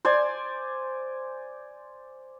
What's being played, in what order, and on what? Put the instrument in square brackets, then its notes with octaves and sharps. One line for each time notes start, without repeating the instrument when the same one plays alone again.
[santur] C5 D5 G#5